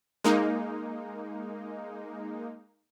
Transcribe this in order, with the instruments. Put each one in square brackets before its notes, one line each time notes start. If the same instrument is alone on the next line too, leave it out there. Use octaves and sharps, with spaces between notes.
[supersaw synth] G#3 A#3 D#4